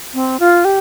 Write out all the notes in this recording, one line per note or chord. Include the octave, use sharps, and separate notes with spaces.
C4
F4
G4